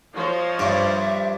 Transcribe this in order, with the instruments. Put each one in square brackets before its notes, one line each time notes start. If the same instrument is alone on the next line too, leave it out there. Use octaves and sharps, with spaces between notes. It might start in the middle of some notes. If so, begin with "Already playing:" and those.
[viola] F3 C5 [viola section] C#5 D#5 F5
[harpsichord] G2 [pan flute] E5